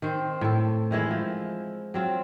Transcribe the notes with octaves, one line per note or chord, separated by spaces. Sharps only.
D#3 C4 C5
A2 A4
D#3 E3 G#3 E4
F3
F#3 C4 F4